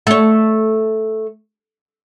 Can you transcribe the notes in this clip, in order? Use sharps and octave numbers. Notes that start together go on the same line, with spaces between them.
A3 C#5